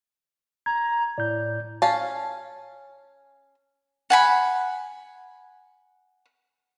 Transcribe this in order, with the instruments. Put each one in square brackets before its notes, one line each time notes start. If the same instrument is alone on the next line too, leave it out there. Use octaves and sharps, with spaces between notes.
[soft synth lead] A#5 [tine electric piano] G#6
[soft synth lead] A2 [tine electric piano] D5 G6
[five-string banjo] C#4 F5 A5
[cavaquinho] F#5 G#5 B5